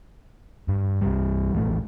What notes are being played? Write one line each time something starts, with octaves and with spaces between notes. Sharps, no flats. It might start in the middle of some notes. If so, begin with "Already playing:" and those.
G2
C2 G2 G3
D#1 A1 A3